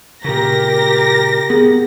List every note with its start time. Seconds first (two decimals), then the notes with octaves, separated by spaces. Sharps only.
0.24 A#2 C#3 G4 A#4 A#6
1.50 B3 G#4